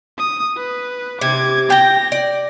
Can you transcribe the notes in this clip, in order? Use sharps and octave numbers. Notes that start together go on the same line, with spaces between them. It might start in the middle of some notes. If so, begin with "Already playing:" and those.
D#6
B4
C3 D6 G#6
G4 G5 A#6
D5